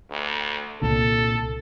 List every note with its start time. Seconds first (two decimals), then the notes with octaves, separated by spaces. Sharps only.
0.11 D2
0.81 C2 A#2 D3 A4